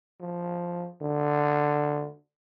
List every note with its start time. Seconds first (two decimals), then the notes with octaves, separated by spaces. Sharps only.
0.21 F3
1.01 D3